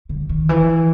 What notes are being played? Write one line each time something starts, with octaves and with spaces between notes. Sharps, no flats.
D3
D#3
E3